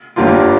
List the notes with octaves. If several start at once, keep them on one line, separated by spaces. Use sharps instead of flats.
G1 G2 G3 A#3 F4